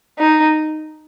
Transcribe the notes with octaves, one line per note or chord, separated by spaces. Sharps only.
D#4